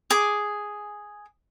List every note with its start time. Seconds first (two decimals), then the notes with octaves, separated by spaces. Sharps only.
0.10 G#4 G#5 D6